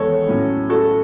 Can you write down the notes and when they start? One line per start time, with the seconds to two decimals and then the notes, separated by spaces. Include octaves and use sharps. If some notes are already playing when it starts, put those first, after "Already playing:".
Already playing: E2 D#3 G#3 B3 A4 C#5
0.27 A2 F#3 C#4
0.69 F#4 A4